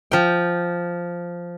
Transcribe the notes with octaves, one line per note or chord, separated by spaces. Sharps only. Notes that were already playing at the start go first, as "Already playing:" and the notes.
F3 G5